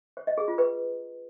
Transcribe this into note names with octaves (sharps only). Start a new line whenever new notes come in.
C#5
D#5
G#4
F4
B4